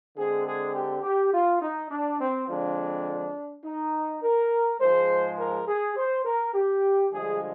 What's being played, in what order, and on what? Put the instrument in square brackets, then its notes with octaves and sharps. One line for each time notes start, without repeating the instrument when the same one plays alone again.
[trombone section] D3 G#3 C4 G#4
G#4
G4
G4
F4
D#4
D4
C4
F2 D3 F3 G#3 D4
D#4
A#4
G#2 F3 G#3 C5
A#4
G#4
C5
A#4
G4
G2 D3 F3 G#3 G#4